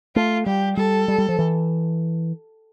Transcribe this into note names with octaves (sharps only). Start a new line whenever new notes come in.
A3 F4
G3 G4
G3 A4
G3
G3
F3
E3